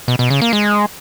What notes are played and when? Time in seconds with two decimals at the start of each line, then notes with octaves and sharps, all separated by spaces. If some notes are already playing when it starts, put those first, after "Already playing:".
0.08 B2
0.19 B2
0.30 C#3
0.42 A#3
0.53 G#3